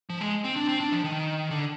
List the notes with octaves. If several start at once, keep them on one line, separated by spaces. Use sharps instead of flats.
F3
G#3
C4
D4
C4
D4
F3
D#3
D3